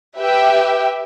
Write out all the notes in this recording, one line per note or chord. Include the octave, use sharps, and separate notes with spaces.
G4 B4 E5 G5